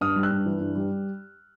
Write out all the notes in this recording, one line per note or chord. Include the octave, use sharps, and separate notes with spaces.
G2 D#6 F6
G3
E6 F#6
G2
E3
G2
G3